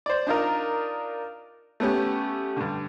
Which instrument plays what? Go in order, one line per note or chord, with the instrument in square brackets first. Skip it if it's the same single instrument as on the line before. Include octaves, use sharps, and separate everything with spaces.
[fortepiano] C5 D5
D4 D#4 F4 A#4
A3 B3 C#4 G4
G2 D3